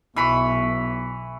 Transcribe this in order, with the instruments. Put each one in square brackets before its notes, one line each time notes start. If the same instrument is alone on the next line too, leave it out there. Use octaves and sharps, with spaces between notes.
[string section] B1 [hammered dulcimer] E3 B5 C#6